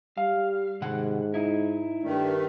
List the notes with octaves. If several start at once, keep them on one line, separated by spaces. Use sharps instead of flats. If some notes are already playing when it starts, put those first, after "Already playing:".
G3 F5
G#2 C3 D#3 F#5
D#4 E4
G2 D#3 A3 D4